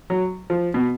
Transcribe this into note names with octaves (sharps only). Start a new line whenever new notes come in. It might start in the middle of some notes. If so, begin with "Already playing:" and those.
F#3
F3
B2